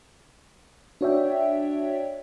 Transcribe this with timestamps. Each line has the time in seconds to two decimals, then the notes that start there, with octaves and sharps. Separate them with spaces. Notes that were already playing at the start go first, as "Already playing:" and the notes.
1.01 D4 F#4 C#5 D5 E5 G5